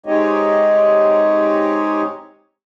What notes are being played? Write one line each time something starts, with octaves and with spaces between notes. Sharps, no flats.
G#3 C4 D#4 G4 C#5 D#5